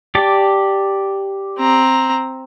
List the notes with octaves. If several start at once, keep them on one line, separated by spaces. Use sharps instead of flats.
G4 D5 A5
C4 A#5